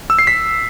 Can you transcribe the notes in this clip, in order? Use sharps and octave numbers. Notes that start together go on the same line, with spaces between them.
E6
C7
B6